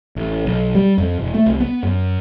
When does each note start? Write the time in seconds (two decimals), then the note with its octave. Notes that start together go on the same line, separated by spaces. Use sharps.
0.16 A1
0.46 B1
0.75 G3
0.98 F2
1.19 E1
1.34 A3
1.46 C2
1.60 B3
1.83 F#2